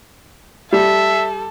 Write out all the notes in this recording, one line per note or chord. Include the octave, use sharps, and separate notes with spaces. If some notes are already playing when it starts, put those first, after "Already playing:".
G3 A4 E5